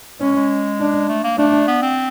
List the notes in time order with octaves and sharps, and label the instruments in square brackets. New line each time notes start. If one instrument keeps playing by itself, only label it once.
[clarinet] G#3 [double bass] C#4
[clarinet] G#3
[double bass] D4
[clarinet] A3
A#3
[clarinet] A3 [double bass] D4
[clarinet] B3
C4